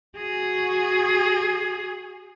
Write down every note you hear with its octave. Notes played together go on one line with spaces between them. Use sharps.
F#4 G#4